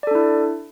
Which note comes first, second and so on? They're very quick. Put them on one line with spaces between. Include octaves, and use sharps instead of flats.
D5 A4 D4 E4